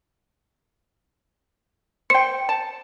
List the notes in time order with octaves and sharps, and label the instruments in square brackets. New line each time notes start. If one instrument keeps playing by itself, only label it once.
[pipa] C5 G5 [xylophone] C#7
[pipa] A5